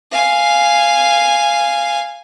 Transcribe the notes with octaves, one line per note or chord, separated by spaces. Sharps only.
F5 G#5